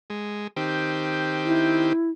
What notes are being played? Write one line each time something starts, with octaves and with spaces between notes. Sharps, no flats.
G#3
D#3 C4 G4
E4